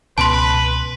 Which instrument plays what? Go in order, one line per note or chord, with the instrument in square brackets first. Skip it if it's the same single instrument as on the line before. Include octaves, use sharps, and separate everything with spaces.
[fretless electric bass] C#2 B2 [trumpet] B4 [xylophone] A5 C6